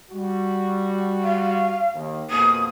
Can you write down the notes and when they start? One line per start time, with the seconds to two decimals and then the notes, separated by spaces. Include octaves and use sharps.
0.11 G3 F#4
1.23 F5
1.93 D#2
2.30 F2 B2 A#3 D#6